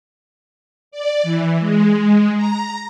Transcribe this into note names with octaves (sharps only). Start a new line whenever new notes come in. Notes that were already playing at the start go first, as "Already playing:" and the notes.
D5
E3
G#3
A#5